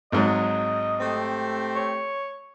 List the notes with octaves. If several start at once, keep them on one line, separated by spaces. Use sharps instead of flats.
G#1 G#2 F#3 D#5
A3 C4 G4
C#5